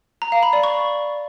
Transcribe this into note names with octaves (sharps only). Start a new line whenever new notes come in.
A#5
F5
B5
D5
C#6